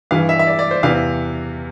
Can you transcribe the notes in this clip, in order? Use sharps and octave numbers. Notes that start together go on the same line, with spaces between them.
G2 E3 F5
E5
E5
D5
D5
C5
E2 C3 E3 F5